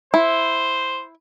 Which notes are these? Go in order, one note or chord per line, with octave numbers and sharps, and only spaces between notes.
E4 C5